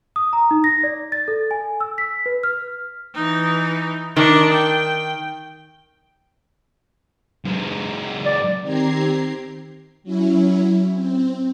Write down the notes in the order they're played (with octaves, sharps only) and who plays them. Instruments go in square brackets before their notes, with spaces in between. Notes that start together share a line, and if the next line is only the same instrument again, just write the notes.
[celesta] D#6
A#5
D#4
A#6
D5
A6
A4
G#5
E6
B6
B4
F6
[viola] E3 D#4
[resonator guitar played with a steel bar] D#3 [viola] D4
[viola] G5
[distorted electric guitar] F#2 G#3
[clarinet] D5
[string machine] D#3 C4 G4 A#5 G#6 C7
F#3 C#4 E4
C4